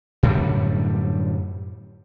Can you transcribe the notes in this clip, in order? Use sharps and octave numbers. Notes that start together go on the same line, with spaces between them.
F#2 A2 D3 G3